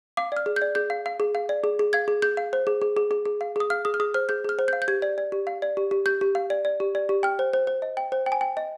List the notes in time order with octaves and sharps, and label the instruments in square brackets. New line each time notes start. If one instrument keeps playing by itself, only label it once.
[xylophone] F5 D6
D5 F6
G#4
G6
D5
G#4 G6
F5
F5
G#4
F5
D5
G#4
G#4
F5 G#6
G#4
G#4 G6
F5
C5
G#4
G#4
G#4
G#4
G#4
F5
G#4 D#6
F5 F6
G#4 D#6
F6
G#4 D#6
C5 F6
G#4 G6
G#4 F6
C5
G6
F5
G6
G4 G#6
D5
D5
G4
F5
D5
G4
G4
G4 G6
G4
F5
D5
D5
G4
D5
G4
G5 F6
C5
C5
C5
D#5
G5
C5
G5
G#5
G5
D#5